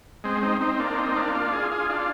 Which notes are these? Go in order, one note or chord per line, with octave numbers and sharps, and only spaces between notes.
G#3 C4
C4 D#4
C4 D#4
D#4
A#3 D4
C4 D#4
A#3 D4
D4 F4
F4 G#4
F4 G#4
D4 F4